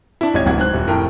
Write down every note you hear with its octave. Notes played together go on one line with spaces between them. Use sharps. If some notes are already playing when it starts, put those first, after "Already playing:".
D4 E4
D#1 G#1 C#5 D#5 G#6
D1 C2 F#5 G#6
G#2 C5 F#6
D#1
F1 A2 A3 A#4 G5